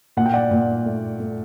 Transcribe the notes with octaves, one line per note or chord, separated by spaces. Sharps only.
A#2 F#5
G5
D5 F#5
A#2
A3
A3